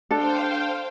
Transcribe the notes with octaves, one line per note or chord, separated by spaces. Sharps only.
D4 A4 C5 F5 G5